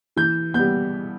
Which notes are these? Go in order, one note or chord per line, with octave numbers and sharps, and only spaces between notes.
E3 G6
G3 B3 G6